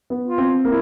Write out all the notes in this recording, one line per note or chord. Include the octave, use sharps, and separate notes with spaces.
B3
F4
C4
A#3 E4